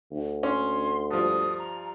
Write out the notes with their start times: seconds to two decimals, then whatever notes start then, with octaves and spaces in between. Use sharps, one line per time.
0.11 D2
0.43 C#4 C6
1.11 G2 F3 D#6
1.59 A#5